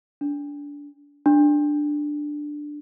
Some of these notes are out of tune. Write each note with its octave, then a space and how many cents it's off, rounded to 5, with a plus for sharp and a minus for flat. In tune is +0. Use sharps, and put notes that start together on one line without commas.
D4 -25
D4 +5